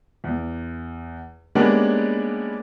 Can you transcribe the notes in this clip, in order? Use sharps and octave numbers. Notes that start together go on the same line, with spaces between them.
E2
G3 G#3 A#3 B3 C#4 D4